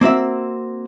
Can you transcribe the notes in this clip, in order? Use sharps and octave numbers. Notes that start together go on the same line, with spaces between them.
A#3 C4 F#4 E5